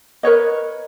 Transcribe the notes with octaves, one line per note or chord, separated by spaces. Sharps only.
A#4 B4 C#5 D#5